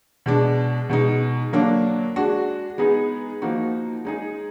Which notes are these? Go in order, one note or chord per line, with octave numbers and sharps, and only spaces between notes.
B2 G#3 D4
B2 G#3 D#4
D3 F#3 A#3 D4
G#3 D4 F#4
G#3 B3 D#4 G#4
F3 A#3 D#4 F#4
G#3 D#4 G#4